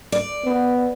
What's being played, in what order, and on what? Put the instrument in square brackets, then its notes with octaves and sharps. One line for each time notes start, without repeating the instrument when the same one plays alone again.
[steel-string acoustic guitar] D5
[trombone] B3